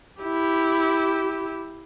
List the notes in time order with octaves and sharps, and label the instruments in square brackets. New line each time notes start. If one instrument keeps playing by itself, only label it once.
[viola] E4 G4